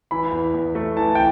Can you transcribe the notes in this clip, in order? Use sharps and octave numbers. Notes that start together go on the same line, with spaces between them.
E3 B5
E2
E2
A3
E3 A5
G5